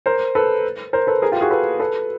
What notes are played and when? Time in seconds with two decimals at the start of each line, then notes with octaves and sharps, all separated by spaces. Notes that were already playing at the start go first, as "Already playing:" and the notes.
0.06 A#4 C5
0.35 A4 B4
0.93 A#4 C5
1.07 A4 B4
1.22 G#4 A#4
1.32 F4 G4
1.41 F#4 G#4
1.51 A4 B4
1.80 A4 B4